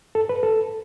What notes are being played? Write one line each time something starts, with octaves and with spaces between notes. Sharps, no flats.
A4
B4
A4